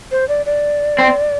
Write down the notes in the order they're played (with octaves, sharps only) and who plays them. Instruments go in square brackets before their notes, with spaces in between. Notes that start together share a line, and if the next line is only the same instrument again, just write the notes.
[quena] C5
D5
D5
[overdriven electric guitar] C4